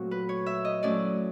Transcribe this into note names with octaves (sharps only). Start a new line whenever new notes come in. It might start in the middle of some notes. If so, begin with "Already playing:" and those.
Already playing: A#2 F#3 A3 C4 F#4
B4
C#5
E5
D#5
F#3 A3 C#4 E4 D5